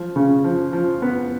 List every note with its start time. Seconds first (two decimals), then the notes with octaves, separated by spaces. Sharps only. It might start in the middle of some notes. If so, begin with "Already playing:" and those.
Already playing: F3
0.16 C#3
0.44 F3
0.73 F3
1.02 B3